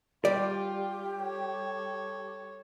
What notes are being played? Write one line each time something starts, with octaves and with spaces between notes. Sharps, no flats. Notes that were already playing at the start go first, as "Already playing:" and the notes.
G3 F4 G4 D5
A4 C#5